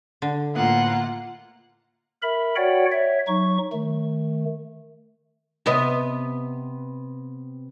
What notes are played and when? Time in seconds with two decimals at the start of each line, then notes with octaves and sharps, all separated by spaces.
0.22 D3
0.56 A2 A#3 B3 F4 F#5
2.22 A#4 E5 B5
2.56 F#4 C#5 D5 F#5 G5
2.91 C#5 E5
3.28 F#3 D#4 C#6
3.72 D#3 A3
5.66 C3 B3 D#5